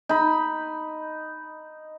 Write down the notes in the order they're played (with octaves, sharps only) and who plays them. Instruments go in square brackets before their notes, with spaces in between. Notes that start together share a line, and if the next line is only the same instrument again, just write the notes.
[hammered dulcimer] D#4 B5